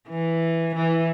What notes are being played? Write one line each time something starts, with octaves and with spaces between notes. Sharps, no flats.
E3
E3